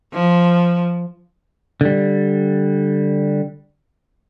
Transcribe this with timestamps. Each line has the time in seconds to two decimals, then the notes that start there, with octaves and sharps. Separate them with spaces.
0.14 F3
1.81 D3 G3